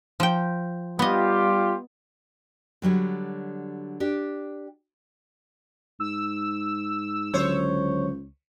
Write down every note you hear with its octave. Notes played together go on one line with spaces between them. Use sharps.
F3 G5
G3 B3 F4 G4 D#5
D3 F#3 G3 C#5
D4 G4
G#2 E6
C#2 D3 F#3 C5 C#5